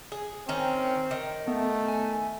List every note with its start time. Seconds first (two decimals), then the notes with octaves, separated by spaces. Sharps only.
0.12 G#4
0.49 D#3 C4 C#4
1.11 D#3
1.48 A3 B3
1.88 G#5